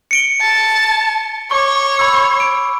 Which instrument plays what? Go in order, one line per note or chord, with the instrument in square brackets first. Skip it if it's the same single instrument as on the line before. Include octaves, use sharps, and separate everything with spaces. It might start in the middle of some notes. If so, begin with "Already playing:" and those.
[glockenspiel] C#7 D7 G7
[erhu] A5
[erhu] C#5 [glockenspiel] C#6 D6
[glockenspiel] B5 E6
D7